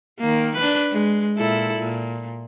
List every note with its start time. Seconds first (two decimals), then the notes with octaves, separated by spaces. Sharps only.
0.20 D#3 A#3
0.56 D4 B4
0.91 G#3
1.37 A#2 E4 A4
1.79 A#2